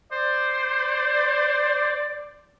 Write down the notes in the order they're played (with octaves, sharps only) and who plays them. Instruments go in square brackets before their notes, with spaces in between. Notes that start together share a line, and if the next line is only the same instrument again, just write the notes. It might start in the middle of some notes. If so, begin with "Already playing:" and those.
[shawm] C5 [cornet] D5